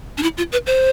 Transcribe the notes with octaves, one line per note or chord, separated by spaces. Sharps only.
D4
E4
F4
B4
C5